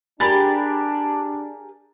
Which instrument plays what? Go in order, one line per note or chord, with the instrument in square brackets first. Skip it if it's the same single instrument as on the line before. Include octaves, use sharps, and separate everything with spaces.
[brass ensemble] D4 [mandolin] G4 G#4 A#4 [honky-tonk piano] B5 A6